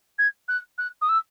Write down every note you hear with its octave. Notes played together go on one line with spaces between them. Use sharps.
G#6
F#6
F#6
D#6
E6